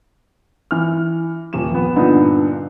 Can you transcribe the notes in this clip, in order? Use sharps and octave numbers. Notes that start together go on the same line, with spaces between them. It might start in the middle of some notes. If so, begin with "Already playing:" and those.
E3 F6
D#1 E7
F2 B3
G2 A#2 D3 B3 D#4